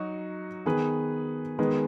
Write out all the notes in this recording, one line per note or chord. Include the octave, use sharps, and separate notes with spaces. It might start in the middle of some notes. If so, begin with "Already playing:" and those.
Already playing: F#3 D#4 F#4
D#3 B3 G#4 B4
D#3 G#3 B3 G#4 B4